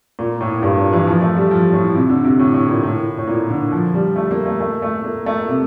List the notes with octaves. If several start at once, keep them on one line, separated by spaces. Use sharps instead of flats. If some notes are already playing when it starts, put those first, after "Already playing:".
A#2
A2
G2
A#2
E3
F3
A3
G3
F3
A2
C3
D3
C3
A2
A2
A#2
A2
A2
A#2
D3
F3
G3
A3
A#3
A3
A3
A3
A#3
A3
C3